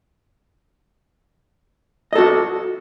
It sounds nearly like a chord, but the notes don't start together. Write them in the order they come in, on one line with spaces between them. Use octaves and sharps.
D#5 A4 F#4